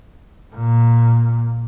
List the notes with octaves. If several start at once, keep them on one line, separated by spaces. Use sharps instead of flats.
A#2